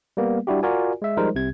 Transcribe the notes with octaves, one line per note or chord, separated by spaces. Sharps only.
G3 A#3 B3
G3 D4 E4 F#4 G4
F4 F#4 A#4 D5 G#5
G#3 E5
F3 G3 G#3 D#4 A#4 C5
C2 C3 G#6